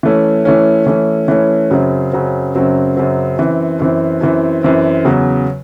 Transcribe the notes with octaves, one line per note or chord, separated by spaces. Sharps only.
E3 A3 C#4
E3 A3 C#4
E3 A3 C#4
E3 A3 C#4
F#2 C#3 F#3 C4
F#2 C#3 F#3 C4
F#2 C#3 F#3 C4
F#2 C#3 F#3 C4
F#2 E3 C4
F#2 E3 C4
F#2 E3 C4
F#2 E3 C4
E2 C#3 F#3